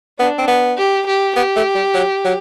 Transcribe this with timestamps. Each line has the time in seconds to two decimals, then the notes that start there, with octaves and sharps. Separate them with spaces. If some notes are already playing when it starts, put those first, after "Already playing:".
0.19 B3 D4
0.38 C4
0.48 B3
0.78 G4
1.07 G4
1.36 B3 G4
1.56 A3
1.75 G3
1.94 F#3
2.25 F#3